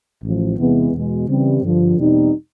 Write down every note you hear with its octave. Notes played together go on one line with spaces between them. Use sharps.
A1 A2 F3
E2 C3 E3 G#3 B3
E2 B2 G#3
C#3 E3 G3 C4
G2 D3 F3
E2 B2 G3 C4 D#4